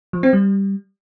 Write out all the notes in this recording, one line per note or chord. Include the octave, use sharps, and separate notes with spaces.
F3
C4
G3